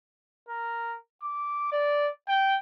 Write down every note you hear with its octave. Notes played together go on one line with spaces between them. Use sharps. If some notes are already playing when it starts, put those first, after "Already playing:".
A#4
D6
D5
G5